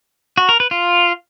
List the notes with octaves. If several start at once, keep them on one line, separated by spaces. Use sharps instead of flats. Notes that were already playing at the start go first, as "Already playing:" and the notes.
F#4
A#4
B4
F4